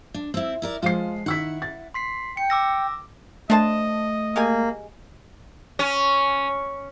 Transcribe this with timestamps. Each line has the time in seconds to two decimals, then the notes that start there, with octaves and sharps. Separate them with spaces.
0.14 D4
0.34 C4 E4
0.62 E4 A#4 D5
0.82 F3 G#3 F4 C7
1.26 D#3 E4 F#5 E6 B6
1.62 A6
1.94 C6 B6 C7
2.37 G5 C#7
2.50 D6 E6 A#6
3.50 A3 D4 C5 D#5 A5
4.36 G#3 A#3 G4 G#5
5.79 C#4